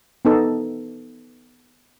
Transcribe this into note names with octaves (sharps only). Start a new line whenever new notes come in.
B3 D#4 A4